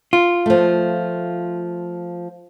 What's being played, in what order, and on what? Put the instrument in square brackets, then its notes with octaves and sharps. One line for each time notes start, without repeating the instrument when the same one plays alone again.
[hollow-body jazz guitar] F4
[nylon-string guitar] F3 A3